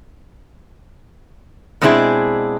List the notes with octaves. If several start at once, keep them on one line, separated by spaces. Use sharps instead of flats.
B2 G#3 C4 D4 E4 G#4